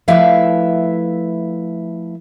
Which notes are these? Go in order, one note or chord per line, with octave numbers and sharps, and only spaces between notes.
F3 A3 E4 B4 E5 F5